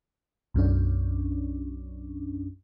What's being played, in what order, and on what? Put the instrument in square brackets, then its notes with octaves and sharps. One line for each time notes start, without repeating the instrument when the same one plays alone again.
[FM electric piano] B1 F#2 C#4 D4